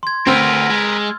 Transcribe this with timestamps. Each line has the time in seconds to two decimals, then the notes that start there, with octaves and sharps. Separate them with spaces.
0.03 C6 G#6
0.27 D2 C4 A#4 B4 E6 F6 A6
0.70 G#3